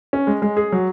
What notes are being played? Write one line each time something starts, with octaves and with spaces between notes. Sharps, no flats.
C#4
G#3
G#3
G#4
F#3